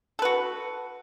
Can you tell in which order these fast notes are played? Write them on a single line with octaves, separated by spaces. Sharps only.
A4 B4 F#4